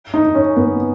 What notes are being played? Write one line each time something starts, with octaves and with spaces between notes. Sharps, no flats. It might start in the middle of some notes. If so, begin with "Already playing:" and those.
D#4
C#4
B3